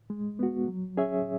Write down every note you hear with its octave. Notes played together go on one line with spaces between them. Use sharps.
G#3
B3 F#4
F#3
C#4 G#4 C#5 E5